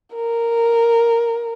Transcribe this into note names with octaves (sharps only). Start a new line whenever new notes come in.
A#4